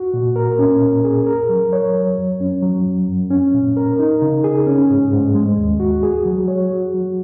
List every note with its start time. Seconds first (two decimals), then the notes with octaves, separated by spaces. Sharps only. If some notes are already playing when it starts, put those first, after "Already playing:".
Already playing: F#4
0.14 A#2
0.36 A#4
0.59 C#4
0.82 A#2
1.05 G#4
1.27 A#4
1.49 F#3
1.73 C#5
1.94 F#3
2.18 F#2
2.41 C#4
2.62 F#3
2.86 F#2
3.08 F#2
3.31 C#4
3.54 A#2
3.77 A#4
3.99 D#4
4.22 C#3
4.44 G#4
4.67 C#4
4.90 G#2
5.13 G#2
5.35 G#3
5.57 D#2
5.80 F#4
6.03 G#4
6.26 F#3
6.48 C#5
6.71 F#4
6.94 F#3